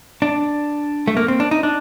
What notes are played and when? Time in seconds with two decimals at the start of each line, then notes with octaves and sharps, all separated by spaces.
0.22 D4
1.08 A3
1.17 A#3
1.28 C4
1.40 D4
1.51 D#4
1.63 D4